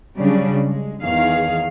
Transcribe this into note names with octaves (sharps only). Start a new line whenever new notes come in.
C#3 F#3 G3 D4
G#3
E2 D#3 G#4 F5